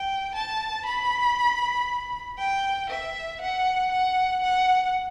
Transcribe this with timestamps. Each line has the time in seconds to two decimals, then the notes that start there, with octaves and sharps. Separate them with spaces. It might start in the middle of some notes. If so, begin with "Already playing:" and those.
Already playing: G5
0.35 A5
0.86 B5
2.39 G5
2.91 E5
3.42 F#5
3.92 F#5
4.43 F#5